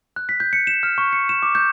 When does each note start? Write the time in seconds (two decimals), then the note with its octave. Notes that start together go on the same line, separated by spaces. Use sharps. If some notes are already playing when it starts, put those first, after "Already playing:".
0.16 F#6
0.29 B6
0.40 G6
0.53 C#7
0.67 E7
0.83 F6
0.98 C#6
1.13 C#7
1.29 E7
1.43 D6
1.55 G6